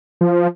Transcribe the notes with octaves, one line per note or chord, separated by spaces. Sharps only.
F3